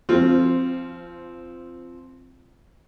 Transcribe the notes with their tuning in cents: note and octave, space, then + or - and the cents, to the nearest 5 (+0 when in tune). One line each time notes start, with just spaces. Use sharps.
F3 -20 C4 +0 F4 +0